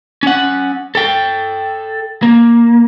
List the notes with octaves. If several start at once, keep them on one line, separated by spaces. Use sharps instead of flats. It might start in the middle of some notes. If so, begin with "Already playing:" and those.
C#4 F#5
A4 G5
A#3